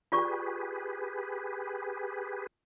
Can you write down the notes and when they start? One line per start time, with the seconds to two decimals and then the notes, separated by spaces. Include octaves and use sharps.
0.12 F4 G4 G#4 B4 D5 C#6